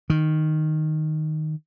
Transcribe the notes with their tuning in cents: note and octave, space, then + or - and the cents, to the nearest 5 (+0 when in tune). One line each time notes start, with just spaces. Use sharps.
D#3 -5